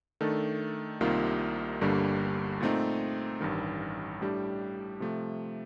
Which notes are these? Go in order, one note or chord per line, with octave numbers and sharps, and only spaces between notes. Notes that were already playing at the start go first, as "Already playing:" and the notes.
D#3 A3 D4 A4
C2 C3 D#3 A#3 F4
G1 G2 D3 G3 A#3
A#2 A3 C4 D#4
A1 G2 D#3
A2 G3 D4 G4
C3 F3 A3